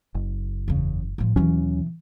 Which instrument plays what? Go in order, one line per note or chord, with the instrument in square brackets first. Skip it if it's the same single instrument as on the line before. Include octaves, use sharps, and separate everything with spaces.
[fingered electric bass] F#1
[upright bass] E2 C#3
A2 F3
[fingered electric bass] D#2 F#3 C#4 [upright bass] B2 E3